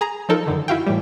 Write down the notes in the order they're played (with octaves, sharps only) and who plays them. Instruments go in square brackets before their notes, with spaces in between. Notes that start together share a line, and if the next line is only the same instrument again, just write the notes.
[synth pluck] G#4 A#5
F3 D#4 A4 A#4
F#2 D3 D#3
E4 F#4 F5 G5
A2 E3 G3